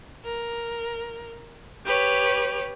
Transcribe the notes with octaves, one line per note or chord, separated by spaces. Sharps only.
A#4
G4 B4 C#5